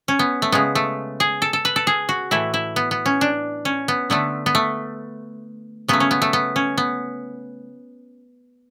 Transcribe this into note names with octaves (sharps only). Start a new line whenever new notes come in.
C#4
B3
A3
C#3 G#3 B3
A3
G#4
A4
A4
B4
A4
G#4
F#4
A2 E3 A3 E4
E4
B3
B3
C#4
D4
C#4
B3
D3 A3 B3
B3
A3
C#3 F#3 A3 B3
C#4
B3
A3
B3
C#4
B3